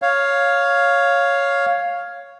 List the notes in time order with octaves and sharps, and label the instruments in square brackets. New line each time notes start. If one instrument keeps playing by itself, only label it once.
[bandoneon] C#5 F5